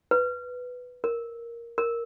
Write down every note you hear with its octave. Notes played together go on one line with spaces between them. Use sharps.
B4
A#4
A#4